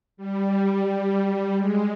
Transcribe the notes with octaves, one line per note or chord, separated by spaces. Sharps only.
G3
G#3